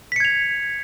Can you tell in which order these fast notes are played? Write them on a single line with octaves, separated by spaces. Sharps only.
B6 C#7 G#6 F7